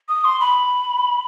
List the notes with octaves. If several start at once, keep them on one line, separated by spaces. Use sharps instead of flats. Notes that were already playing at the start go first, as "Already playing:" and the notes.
D#6
C6
B5